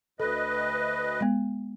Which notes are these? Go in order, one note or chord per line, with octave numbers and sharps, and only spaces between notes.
D2 A4 B4 D#5
G#3 B3